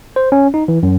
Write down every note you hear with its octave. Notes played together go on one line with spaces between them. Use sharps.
C5
C#4
D#4
E3
F#2